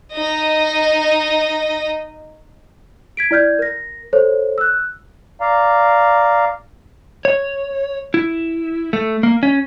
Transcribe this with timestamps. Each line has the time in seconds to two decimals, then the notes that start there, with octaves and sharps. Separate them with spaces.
0.13 D#4 D#5
3.17 G#6 B6 D7
3.31 E4 D5 F6 G6 G#6
3.59 A#4 A#6
4.13 A4 C5 C#5
4.58 E6 F#6
5.41 D5 F5 A#5
7.25 C#5
8.14 E4
8.93 A3
9.23 A#3
9.43 C#4